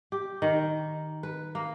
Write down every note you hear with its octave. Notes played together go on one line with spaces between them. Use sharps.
G4
D#3
B4
A#3